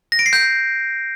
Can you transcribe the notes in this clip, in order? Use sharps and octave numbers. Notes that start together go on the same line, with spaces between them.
A#6
D7
C7
G6